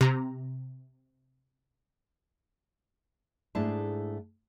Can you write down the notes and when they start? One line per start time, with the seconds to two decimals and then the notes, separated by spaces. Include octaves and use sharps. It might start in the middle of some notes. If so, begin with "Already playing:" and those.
0.01 C3 A#5
3.55 G#2 A3 D4 E4 G#4 A5